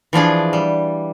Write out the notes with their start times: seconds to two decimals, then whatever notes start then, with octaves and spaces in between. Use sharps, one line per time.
0.13 E3 F3 D4 G#4
0.53 G3